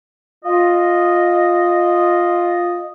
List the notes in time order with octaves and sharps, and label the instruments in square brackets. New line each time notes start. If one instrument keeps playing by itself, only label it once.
[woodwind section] F4 D#5